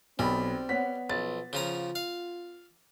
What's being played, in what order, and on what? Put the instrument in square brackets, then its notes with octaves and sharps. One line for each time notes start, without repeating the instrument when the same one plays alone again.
[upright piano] B1 B5 [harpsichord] G3 [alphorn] C4
[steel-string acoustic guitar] B3 C#5 F#5 [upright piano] B6
[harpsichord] B1 [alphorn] F3 [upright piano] A6
[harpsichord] C#3 F3 A#5 [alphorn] F4
[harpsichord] F5